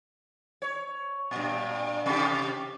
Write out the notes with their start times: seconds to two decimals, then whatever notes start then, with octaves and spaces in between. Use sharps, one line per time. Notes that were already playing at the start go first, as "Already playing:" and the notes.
0.62 C#5
1.31 G2 A#2
2.06 C3 G4